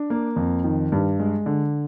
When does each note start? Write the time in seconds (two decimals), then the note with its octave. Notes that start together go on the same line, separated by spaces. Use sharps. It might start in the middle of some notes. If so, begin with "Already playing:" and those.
Already playing: D4
0.10 A#3
0.36 F2
0.64 D#3
0.92 G2
1.20 G#3
1.46 D3